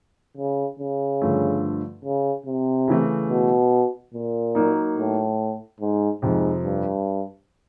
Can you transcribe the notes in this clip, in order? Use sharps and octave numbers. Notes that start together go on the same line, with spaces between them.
C#3
C#3
G2 D3 F3 A3
C#3
C3
C#3 E3 A3
B2
A#2
F#3 A#3 D#4
A2
G#2
F2 G#2 C3 F3
G2